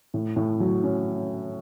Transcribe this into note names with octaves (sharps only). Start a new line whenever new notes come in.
A2
A2
F#3
C#4